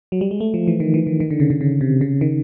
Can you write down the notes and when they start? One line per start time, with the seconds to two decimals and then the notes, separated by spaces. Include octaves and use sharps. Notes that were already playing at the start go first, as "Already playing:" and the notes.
0.12 F#3
0.21 G3
0.31 G#3
0.40 A3
0.54 F3
0.67 E3
0.80 D#3
0.94 E3
1.07 D#3
1.20 D#3
1.30 D3
1.40 C#3
1.50 C#3
1.61 C#3
1.81 C3
2.01 C#3
2.21 D#3